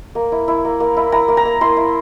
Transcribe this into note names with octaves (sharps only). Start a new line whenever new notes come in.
A#3
E4
E4
A#3
A#3
E4
E4 A#5
A#3
A#5
A#3
E4 C6
E4